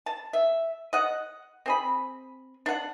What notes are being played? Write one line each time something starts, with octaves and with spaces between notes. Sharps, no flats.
A5
E5
D#5 F#5
C4 G#4 B5
D4 F#5